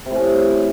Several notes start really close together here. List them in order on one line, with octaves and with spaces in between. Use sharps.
C3 A2 C#4